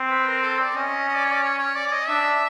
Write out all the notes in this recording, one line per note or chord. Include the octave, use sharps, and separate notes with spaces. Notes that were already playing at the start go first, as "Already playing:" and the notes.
Already playing: C4
B4
A#4
A4
D5
C#4 D#5
D#5
D5
C#5
D5
C#5
C#5
D5
D5
D#5
D4 E5